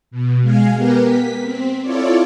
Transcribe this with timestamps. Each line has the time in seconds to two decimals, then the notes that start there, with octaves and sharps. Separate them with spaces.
0.11 B2
0.42 G#3 F5 G#5
0.75 B3 G4 A#4 B4
1.05 B6
1.43 C4
1.82 E4 F4 A4 C#5 D5